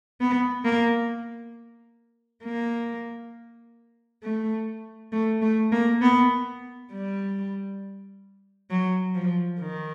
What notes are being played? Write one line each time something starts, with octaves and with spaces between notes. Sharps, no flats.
B3
A#3
A#3
A3
A3
A3
A#3
B3
G3
F#3
F3
D#3